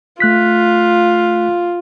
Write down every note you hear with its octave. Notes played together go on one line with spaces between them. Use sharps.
A3 F4 F#6 B6